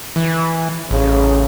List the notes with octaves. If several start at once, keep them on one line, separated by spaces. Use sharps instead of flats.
E3
A1 C#3